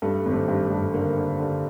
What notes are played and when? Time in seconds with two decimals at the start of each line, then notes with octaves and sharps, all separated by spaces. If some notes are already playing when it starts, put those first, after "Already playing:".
0.02 G2 A3
0.26 G#1
0.33 A3
0.48 G2
0.64 A3
0.71 G2
0.94 D3 A#3
1.17 D3
1.39 D3